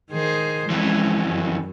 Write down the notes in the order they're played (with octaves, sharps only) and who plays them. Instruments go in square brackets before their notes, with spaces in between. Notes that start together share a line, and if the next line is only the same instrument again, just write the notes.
[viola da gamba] D#3 G#4 C5
[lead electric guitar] F2 E3 [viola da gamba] G#3 C#4
[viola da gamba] F#2